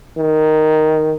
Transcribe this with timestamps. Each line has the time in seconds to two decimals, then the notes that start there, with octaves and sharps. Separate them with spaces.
0.18 D#3